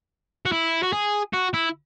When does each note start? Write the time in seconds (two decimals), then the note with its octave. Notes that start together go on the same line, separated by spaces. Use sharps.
0.46 F#4
0.52 E4
0.83 F#4
0.93 G#4
1.34 F#4
1.54 E4